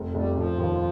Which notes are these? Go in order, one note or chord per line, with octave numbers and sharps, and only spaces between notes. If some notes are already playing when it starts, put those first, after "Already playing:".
Already playing: F1
F1 G3
F1 F3
D#2